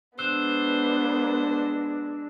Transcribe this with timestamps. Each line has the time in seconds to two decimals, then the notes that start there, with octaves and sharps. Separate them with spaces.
0.19 G#3 B3 D4 C5 E6 F#6 E7